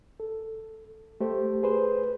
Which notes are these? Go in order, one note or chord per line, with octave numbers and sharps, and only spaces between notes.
A4
A3 G4 C5
G#4 B4 C5